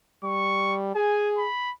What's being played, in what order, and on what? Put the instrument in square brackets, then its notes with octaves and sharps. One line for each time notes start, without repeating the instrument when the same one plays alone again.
[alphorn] G3 [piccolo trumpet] C#6
[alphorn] G#4 [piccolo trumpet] G#5
[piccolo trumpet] B5